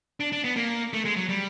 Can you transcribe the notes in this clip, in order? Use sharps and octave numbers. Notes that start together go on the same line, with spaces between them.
D4
D4
B3
A#3
A3
G#3
F#3
G3